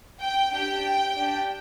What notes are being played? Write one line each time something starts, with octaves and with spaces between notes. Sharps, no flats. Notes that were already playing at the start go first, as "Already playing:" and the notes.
G5
D4 G4 G5
D4 G4